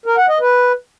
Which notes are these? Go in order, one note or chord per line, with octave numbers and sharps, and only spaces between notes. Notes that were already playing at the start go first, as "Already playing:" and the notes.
A#4
F#5
D#5
B4